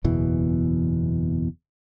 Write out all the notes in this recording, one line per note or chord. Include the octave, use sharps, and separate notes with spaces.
F#1 E2 B2 E3